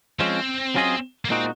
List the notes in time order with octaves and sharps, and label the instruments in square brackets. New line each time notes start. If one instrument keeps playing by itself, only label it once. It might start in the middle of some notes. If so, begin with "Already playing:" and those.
[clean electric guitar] F3 G#3 C#4 [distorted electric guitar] C4
[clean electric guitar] F#3 C#4 F4 G#4 D#5
[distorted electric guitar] A#3
[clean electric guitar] A#2 G#3 D#4 F#4 [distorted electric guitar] C4